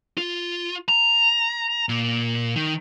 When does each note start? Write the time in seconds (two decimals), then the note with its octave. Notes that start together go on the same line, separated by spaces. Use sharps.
0.18 F4
0.89 A#5
1.89 A#2
2.56 D#3